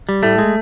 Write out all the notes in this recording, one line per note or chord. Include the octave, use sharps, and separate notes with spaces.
G3
A2 A3
G#3